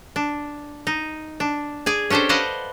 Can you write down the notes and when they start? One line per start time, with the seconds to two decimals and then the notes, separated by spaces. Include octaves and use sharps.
0.16 D4
0.87 D#4
1.40 D4
1.86 G#4 D5 G#5
2.10 C#4 D4 G4 A4 C5
2.29 B4 C5 D5 D#5 F5 F#5